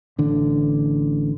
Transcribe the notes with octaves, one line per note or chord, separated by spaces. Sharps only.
A1 D3